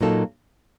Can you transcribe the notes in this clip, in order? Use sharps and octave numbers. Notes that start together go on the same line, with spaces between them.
A#2 F#3 A#3 D#4 A4